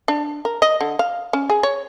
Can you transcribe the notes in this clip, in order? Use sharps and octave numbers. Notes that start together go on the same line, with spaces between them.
D4
A#4
D#5
D3
F5
C#4
G#4
C#5